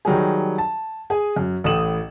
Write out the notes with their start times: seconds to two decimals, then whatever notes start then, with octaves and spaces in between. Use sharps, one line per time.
0.05 D#3 F#3 G3 G#4
0.58 A5
1.10 G#4 G#5
1.36 F#2
1.64 A1 A2 A3 D#6 E7 F#7